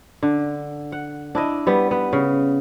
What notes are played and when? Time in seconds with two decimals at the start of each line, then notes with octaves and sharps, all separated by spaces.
0.23 D3
0.92 F#5
1.35 D4 E4 D#5
1.67 G3 B3
1.91 B3
2.13 C#3